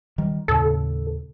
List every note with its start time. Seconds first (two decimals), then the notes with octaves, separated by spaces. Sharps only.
0.18 D#3 G3
0.48 D#2 A2 C#3 A4